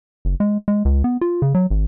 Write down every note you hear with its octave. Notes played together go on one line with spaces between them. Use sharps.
F#1
G#3
G#3
C#2
B3
F4
C#3
F#3
G#1